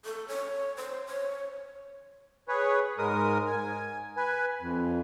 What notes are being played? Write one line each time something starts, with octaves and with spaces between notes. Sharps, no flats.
A4
C#5
C5
C#5
G#4 B4 C#5
G#2 G#3 A#4 D#6
G#5
B4 G#5
F2